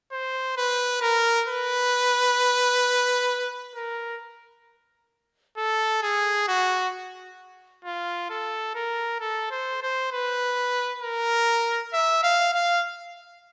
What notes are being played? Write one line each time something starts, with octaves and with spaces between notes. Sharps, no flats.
C5
B4
A#4
B4
A#4
A4
G#4
F#4
F4
A4
A#4
A4
C5
C5
B4
A#4
E5
F5
F5